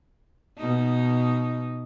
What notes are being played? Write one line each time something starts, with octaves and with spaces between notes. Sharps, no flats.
B2 D#4